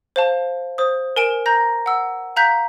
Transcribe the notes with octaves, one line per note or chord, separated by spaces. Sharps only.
C5 F5 A5
C5 D#6
A#4 G#5 D7 E7
A#5 G6 A#6
F#5 E6
F5 A#5 F#6 G6 B6